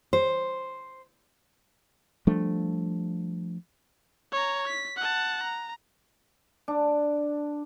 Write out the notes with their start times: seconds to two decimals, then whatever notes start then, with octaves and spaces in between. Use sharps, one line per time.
0.13 C5
2.27 F3 G3 A3 D4
4.32 C#5 A#5
4.68 B6
4.97 F#5 A5
5.43 A#5
6.68 D4